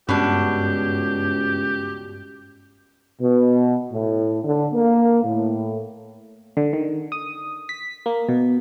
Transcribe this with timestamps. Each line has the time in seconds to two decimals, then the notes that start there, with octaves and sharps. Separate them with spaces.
0.09 C#2 G2 B2 D4 G4
3.21 B2
3.90 A2
4.44 D3
4.73 A#3
5.24 A2
6.57 D3
6.73 D#3
7.12 D#6
7.69 B6
8.06 A#3
8.29 B2